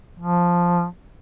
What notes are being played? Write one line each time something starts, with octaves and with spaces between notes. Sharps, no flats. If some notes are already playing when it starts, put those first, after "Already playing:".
F3